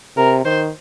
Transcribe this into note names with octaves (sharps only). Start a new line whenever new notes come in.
C3 A#4
D#3 C5